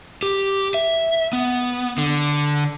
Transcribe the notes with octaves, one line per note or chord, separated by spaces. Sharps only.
G4
E5
B3
D3